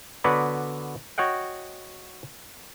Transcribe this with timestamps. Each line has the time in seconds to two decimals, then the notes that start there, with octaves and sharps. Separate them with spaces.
0.24 D3 B3 F#4 B4 C#5 D5
1.18 F#4 C#5 D#5 F#5 G5